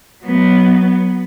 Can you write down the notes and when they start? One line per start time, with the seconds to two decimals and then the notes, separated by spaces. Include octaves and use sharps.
0.23 F#3 B3